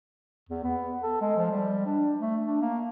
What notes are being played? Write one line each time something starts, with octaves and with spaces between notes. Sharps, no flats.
E2
B3
A4
G#3
F3
G3
D4
A3
D4
A#3